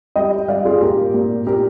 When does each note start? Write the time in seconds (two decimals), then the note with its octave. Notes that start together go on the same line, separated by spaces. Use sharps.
0.16 G3 D#5 G5
0.48 G3 D5 F5
0.65 F4 G#4
0.81 A#2 G4 A#4
1.14 A#2
1.47 A#2 G4 A#4